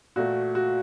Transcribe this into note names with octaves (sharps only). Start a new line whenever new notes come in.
A#2 A3 F#4
F#4